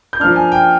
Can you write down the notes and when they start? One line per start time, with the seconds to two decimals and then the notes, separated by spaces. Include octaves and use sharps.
0.13 G6
0.20 F3 A#3 D4 F6
0.36 G#5
0.52 G5